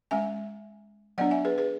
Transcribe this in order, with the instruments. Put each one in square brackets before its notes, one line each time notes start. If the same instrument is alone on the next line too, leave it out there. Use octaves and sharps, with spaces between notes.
[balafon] G#3 C#4 E5 G#5
F#3 B3 D4 D5 F#5
E5 G#5
G#4 B4
G#4 B4